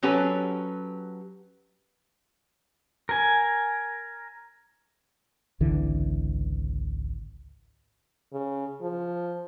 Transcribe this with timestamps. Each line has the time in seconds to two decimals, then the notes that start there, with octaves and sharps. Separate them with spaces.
0.03 F#3 C#4 G4 A4 B4
3.09 A#4 G#5
5.60 G#1 C#2 D3 E3
8.33 C#3
8.81 F3